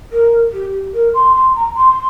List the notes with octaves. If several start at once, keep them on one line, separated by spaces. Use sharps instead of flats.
A#4
G4
A#4
C6
C6
A#5
C6